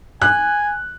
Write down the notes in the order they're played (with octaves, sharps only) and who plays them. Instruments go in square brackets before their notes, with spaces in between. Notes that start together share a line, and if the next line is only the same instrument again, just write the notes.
[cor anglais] G#5 [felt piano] F#6